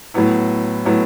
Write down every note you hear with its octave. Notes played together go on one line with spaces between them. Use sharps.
A2 F#3 B3 E4
A2 F#3 B3 E4